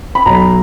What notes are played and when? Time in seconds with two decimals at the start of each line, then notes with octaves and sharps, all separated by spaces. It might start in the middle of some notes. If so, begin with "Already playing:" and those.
0.15 B5
0.26 B1 A#5